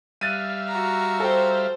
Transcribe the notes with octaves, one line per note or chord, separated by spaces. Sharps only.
G3 E5 F5 F#6 A6 D#7
F#4 A#5
A4 C5 G5